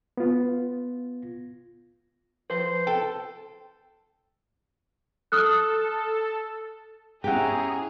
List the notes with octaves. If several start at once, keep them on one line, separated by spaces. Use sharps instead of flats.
B3 F4
F3 B4 C5
A4 G5
A4 D#6 F6 F#6
C#4 E4 G4 G#4 F#5 G5 A#5